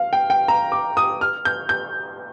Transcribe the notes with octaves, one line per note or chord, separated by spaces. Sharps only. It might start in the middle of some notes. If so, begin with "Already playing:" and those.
Already playing: F5
G5
G5
A#5
D6
D#6
F6
G6
G6